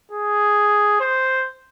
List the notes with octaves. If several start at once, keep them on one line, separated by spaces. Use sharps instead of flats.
G#4
C5